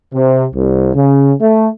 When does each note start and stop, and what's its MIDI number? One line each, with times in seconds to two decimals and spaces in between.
0.14 0.45 48
0.55 0.91 36
0.95 1.32 49
1.41 1.67 57